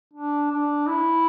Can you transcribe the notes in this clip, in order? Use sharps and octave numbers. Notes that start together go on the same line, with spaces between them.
D4
D4
E4